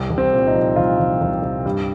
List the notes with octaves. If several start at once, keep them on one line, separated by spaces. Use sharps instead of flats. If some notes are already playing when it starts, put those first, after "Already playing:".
Already playing: C2
C2
C4
A#2
D#4
F3
C2 F4
C2
C2
C2
G2